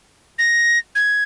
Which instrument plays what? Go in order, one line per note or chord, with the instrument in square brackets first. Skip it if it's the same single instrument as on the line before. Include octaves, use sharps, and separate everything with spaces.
[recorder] A#6
G#6